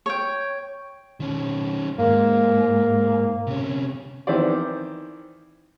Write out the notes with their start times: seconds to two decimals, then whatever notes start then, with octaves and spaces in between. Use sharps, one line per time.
0.06 C#5 G5
1.20 D#3 C#4
1.99 G#2 A#3
3.47 C3 C#4
4.27 D#3 E3 C4 C5 D5